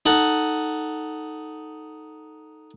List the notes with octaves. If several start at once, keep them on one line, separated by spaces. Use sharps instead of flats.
D#4 A4 F#5